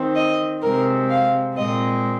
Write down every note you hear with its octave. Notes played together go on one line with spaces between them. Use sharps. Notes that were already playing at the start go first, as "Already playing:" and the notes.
Already playing: D#3 C4
D#5
C3 G#3 C4 A#4
F5
A#2 G#3 C4 D#5